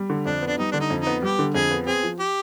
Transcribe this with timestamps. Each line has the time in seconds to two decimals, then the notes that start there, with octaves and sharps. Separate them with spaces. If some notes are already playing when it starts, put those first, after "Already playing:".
Already playing: G3
0.10 D3
0.25 F2 D4
0.42 B3
0.47 D4
0.58 G3 D#4
0.72 D3 D4
0.80 D#4
0.90 F2
1.01 D#4
1.07 B3
1.22 G3 G4
1.39 D3
1.54 F2 G#4
1.71 B3
1.87 C4 G#4
2.03 F3
2.19 G4